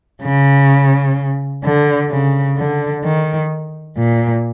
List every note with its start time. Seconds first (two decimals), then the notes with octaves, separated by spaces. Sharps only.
0.23 C#3
1.64 D3
2.10 C#3
2.57 D3
3.05 D#3
3.98 A#2